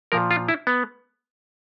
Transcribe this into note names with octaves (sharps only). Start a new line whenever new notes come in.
A#2 F3 A#4
F4
E4
B3